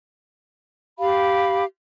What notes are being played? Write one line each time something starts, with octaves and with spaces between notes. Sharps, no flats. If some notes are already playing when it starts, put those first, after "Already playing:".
G4 F5 B5